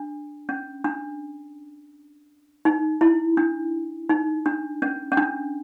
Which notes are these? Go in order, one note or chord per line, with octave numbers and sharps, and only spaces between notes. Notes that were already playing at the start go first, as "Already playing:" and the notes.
Already playing: D4
C#4
D4
D#4
E4
D4
D#4
D4
C#4
C#4
D4